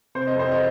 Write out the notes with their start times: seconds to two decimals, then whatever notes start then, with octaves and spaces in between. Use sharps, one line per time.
0.15 C3 C5
0.27 D#5
0.36 F2 C5
0.51 D#5